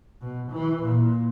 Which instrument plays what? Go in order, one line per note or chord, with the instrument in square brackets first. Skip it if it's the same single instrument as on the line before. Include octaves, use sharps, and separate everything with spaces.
[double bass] B2
E3
A#2